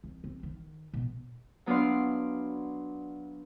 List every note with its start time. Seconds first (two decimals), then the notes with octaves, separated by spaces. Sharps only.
0.04 C2
0.24 C4
0.43 D#3
0.94 B2
1.66 F#3 B3 D4 D5 F5 C6